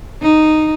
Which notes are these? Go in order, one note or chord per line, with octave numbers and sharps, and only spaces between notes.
D#4